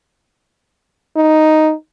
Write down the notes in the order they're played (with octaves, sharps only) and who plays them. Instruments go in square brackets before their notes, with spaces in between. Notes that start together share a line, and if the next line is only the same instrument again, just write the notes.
[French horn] D#4